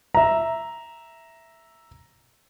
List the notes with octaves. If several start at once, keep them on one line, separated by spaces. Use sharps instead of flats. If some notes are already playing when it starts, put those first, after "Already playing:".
E5 A#5